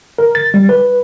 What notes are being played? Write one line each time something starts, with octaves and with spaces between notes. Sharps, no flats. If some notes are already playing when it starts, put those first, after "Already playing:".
A#4
A6
G3
B4